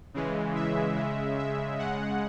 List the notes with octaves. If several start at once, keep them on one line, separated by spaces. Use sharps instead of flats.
C#3 E3 G#3
E5
C#3 G#3
E5
C#3 G#3 F#5